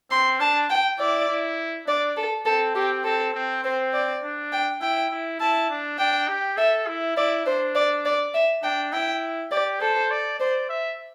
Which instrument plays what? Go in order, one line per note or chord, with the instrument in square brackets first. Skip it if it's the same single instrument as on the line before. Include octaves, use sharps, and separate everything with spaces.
[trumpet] C4 [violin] C6
[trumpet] D4 [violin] A5
[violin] G5
[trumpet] E4 [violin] D5
[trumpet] E4
[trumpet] D4 [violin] D5
[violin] A4
[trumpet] C4 [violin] A4
[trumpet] C4 [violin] G4
[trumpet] C4 [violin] A4
[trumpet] C4
[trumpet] C4 [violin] C5
[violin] D5
[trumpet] D4
[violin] G5
[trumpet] E4 [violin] G5
[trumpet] E4
[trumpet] E4 [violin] A5
[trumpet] D4
[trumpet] D4 [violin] G5
[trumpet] G4
[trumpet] A4 [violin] E5
[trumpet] E4
[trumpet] E4 [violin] D5
[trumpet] D4 [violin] C5
[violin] D5
D5
E5
[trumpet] D4 [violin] G5
[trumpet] E4 [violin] G5
[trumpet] G4 [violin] D5
[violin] A4 [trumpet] C5
[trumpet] D5
[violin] C5 [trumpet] D5
[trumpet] E5